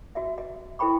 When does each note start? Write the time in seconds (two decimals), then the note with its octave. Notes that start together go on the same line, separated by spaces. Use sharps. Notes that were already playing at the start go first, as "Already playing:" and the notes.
0.15 F#4 D#5 E5
0.38 D#5
0.79 E4 A4 C5 G5 B5 C#6